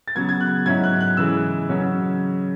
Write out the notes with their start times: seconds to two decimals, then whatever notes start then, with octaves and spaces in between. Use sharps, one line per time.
0.08 A6
0.15 C#3 F#3 B3 G#6
0.29 G#6
0.41 F#6
0.66 G#2 F#3 C#4 E4 G#6
0.84 F#6
1.01 F#6
1.17 C#3 E3 G#3 E6
1.69 C#3 F#3 C#4